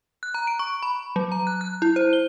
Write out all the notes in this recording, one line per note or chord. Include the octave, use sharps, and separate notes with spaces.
F#6
A#5
D7
C#6
B5
F#3
A#5
F#6
F#6
E4
C5
G7